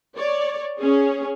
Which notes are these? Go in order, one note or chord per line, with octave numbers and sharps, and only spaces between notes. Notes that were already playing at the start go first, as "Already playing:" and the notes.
C#5 D5
C#4 G#4 C#5